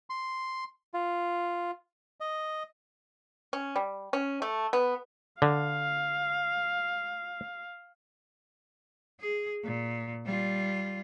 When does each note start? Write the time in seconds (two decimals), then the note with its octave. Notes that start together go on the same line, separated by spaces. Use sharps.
0.10 C6
0.94 F4
2.20 D#5
3.53 C#4
3.76 G3
4.13 C#4
4.42 A3
4.73 B3
5.42 D3 F5
9.20 G#4
9.64 A#2
10.26 G3 F4